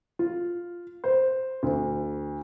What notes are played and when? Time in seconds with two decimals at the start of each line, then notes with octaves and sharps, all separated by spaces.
0.19 F4
1.04 C5
1.63 D2